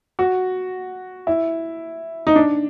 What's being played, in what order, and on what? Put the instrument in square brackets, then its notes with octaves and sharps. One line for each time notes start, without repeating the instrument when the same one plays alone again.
[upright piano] F#4
E4
D#4
D4